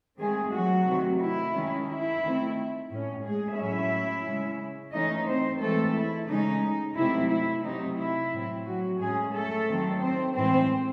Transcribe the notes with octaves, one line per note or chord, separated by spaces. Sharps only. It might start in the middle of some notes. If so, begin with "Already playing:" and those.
D#3 G#3 A3 C4 G#4
F#3 F#4
C3 D#3 A3 C4
E4
D#3 G#3 C#4
E4
D#3 A3 C4
A2 G#3 C#4
G#3 G#4
A2 F#3 C#4 E4 E5
C#3 G#3 C#4
E3 A3 C#4 D#4 D#5
C4 C5
E3 G#3 A3 C4 A4
E4
C#3 G#3 C#4 D#4
C3 F#3 A3 C4 E4
E4
C3 F#3 A3 C4 D#4
E4
A2 F#3 C4
F#3 F#4
A2 F#3 G#3 C#4 G#4
A3 A4
D#3 F#3 C4
C4 C5
A2 E3 G#3 C4 C5